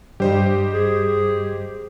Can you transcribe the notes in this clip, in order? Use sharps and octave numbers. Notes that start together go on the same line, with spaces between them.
G2 G3 G4 C5 D#5
G#4